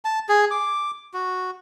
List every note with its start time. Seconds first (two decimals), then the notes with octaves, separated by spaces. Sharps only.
0.05 A5
0.29 G#4
0.51 D6
1.14 F#4